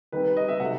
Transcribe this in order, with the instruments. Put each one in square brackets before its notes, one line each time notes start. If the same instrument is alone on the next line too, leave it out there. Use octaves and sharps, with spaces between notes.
[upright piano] D#3 G3 C4 B4
B4
D#5
E5
C3 F#3 A3 F#5